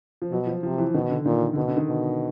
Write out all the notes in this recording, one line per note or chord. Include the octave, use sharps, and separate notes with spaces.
F3
B2 F#3
F3
C3 F3
E3
B2 D#3
D3
A#2 D#3
D3
B2 D#3
D3
D#3
B2